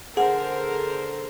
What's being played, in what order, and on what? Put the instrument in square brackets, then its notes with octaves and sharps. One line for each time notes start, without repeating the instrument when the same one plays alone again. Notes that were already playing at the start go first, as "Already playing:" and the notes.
[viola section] D3 A#4 C5 [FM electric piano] G#4 [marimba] F#5